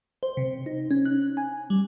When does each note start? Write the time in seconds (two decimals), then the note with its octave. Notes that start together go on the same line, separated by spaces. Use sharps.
0.23 C5
0.37 C3
0.66 D#4
0.91 C#4
1.05 F#6
1.37 G#5
1.70 G3